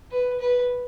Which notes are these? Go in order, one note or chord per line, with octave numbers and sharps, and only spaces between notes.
B4
B4